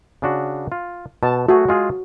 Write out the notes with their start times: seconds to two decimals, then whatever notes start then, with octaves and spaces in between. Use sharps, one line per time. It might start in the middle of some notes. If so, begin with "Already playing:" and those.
0.22 C#3 D4 F#4
0.72 F4
1.23 B2 A5
1.49 A3 F#4 G#4
1.69 G#3 F4 G#4